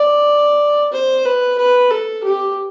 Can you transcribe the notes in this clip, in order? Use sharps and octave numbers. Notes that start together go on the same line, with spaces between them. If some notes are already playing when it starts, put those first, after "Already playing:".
Already playing: D5
C5
B4
B4
A4
G4